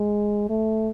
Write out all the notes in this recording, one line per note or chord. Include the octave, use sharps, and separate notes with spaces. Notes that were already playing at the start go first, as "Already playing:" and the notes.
Already playing: G#3
A3